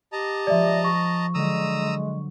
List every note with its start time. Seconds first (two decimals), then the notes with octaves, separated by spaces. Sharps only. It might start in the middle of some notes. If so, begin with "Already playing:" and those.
0.12 G4 D#5 A5 A#5
0.47 F3 G#3 D5 E5
0.84 C#6
1.34 D3 F#3 G#3 A#5 D#6 E6